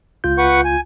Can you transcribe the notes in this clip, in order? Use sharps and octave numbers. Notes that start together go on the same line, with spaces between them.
C#2 F4 G6
B4 F#5 C#6
G#5